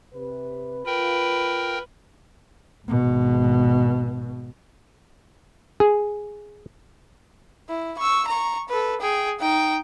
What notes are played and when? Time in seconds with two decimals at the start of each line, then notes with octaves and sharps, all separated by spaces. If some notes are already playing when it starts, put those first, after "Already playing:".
0.13 C3 B4
0.86 F4 A#4 B4 G5
2.87 G#1 B2
5.80 G#4
7.69 E4
7.98 C#6 E6
8.28 A#5 C#6
8.69 A4 B4
9.01 G#4 G5
9.40 D#4 G5